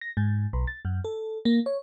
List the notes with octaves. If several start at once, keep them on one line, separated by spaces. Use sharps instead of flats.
A#6
G#2
B1
A6
F#2
A4
A#3
C#5